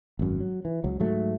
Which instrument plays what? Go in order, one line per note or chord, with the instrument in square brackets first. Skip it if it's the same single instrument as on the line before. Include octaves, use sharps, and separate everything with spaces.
[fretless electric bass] G#1 F#2
F#3
E3
C#2 F#3
G#2 F#3 A3